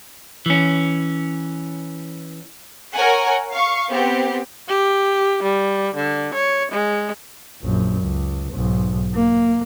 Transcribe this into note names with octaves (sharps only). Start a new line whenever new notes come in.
E3 C#4
A#4 C#5 F#5 G#5
F5 C#6
B3 C4 G4
G4
G3
D3
C#5
G#3
A#1 F#2
C#2
B1 G#2
A#3